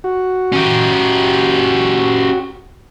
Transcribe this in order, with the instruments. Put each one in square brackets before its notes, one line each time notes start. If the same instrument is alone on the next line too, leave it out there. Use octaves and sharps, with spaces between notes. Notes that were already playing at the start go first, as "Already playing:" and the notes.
[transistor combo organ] F#4
[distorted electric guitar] C#4 G4